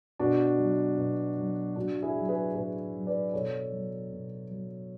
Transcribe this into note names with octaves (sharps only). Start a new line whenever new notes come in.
B2 D4 F#4
F#3
B2
F#3
A2 D4 F#4
E4 G#4
F#3
G#4 B4
A2 G#4 B4
F#3
B4 D5
B2 A4 C#5
F#3
B2
F#3